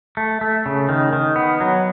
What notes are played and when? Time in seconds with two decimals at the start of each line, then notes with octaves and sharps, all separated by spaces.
0.17 A3
0.41 A3
0.66 C#3
0.89 D#3
1.13 D#3
1.36 B3
1.60 F#3